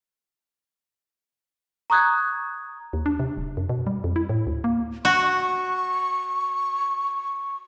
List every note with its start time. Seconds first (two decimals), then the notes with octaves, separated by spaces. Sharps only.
1.90 A#5 C#6 D#6 F#6 G#6
2.93 D#2
3.06 D4
3.19 C3
3.37 D#1
3.57 F#2
3.69 B2
3.87 G3
4.04 F2
4.16 E4
4.29 A2
4.47 D2
4.64 A#3
5.05 F#4 C#6